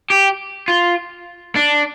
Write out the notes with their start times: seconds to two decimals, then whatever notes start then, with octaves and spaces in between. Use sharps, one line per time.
0.10 G4
0.68 F4
1.56 D4